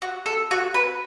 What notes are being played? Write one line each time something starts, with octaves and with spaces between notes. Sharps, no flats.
F#4
A4
F#4
B4